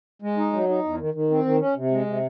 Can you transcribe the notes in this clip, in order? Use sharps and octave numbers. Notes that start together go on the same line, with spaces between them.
G#3
D#4
F#3
D#4
E2
D#3
D#3
C4
D#3
C#4
C3
G#3
C3